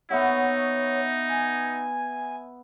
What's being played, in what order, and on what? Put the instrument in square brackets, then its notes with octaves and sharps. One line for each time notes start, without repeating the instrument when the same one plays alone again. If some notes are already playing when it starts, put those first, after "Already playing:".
[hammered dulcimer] B3 E5 F#5 [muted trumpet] D#4 [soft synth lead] C#5
[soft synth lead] G#5